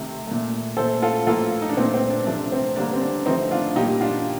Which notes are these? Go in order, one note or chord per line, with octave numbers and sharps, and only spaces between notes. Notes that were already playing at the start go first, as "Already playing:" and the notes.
Already playing: C3 D#3 A3
A#2 A3
A#2 A3 A4 C5
F4 A4
A2 F3 A#3 F4 A4
D#4
D4
A#2 A3 C4
C4
D4
C3 F3 A3 D4
C4
D3 G3 A#3 D4
C4
D4
D3 F3 A3 C4 D#4
D4 F4
A#2 G3 A#3 D#4 G4
D4 F4